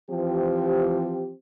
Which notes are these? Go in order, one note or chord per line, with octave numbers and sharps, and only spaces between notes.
E3 F3 C4 G4